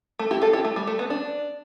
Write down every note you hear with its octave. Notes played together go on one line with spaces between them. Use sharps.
A3
E4 G4
F4 A4
E4 G4
A3
G3
A3
B3
D4